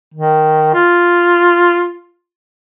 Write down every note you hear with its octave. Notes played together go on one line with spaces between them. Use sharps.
D#3
F4